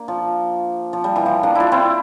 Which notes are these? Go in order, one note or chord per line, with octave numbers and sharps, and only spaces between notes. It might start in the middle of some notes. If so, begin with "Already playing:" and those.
Already playing: A#3 D4
F3
F3
G3
E3
F3
A#3 D4
D4 E4 F4
C4 E4